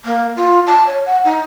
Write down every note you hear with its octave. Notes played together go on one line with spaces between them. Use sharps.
A#3
F4
A5
C#5
F#5
D#4